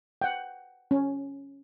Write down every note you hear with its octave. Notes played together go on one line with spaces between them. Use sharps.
F#5 G5
C#4